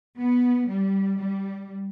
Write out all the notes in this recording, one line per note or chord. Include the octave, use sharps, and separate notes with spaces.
B3
G3
G3